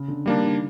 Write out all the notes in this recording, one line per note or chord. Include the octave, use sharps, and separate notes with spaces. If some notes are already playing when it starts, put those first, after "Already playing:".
Already playing: C#3
D3
D#3 G3 A#3 D4
D3